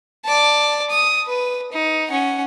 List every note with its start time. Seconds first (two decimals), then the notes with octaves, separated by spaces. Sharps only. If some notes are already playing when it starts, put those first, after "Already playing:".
0.25 D5 A5
0.90 D#6
1.26 B4
1.72 D#4
2.08 C#4 F#5